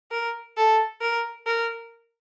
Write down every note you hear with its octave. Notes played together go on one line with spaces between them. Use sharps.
A#4
A4
A#4
A#4